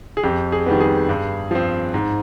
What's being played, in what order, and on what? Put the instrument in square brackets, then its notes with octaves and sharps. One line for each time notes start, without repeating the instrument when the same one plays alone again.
[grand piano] G#4
F2 G4
G#4
D#3 G3 B3
G#4
G2
F3 C4
G#2